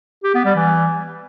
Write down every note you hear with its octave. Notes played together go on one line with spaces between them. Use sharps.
G4
B3
G3
E3